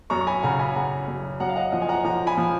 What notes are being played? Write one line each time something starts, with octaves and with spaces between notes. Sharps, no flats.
F#2 A#5 C#6
C#6
G#5 B5
C#3 F#5 A#5
G#5 B5
C#3 F#5 A#5
F#2
F#2 F#5 A#5
F5
D#5 F#5
F3 D#5 F#5
G#5
F#5 A#5
F3 F#5 A#5
G#5 B5
F3